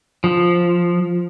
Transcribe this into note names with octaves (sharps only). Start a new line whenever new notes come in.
F3